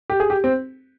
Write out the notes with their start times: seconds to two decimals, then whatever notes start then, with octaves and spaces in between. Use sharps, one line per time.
0.10 G4
0.20 G#4
0.30 G4
0.44 C4